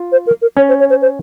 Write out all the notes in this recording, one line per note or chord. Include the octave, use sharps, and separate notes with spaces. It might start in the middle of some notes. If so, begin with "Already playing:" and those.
Already playing: F4
C5
A#4
A#4
C#4 C#5
C5
C#5
C5
C5